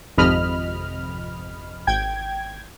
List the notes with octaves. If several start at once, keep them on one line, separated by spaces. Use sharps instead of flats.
G#1 F2 C3 D#5 B5 F6
G#1 G5 G#6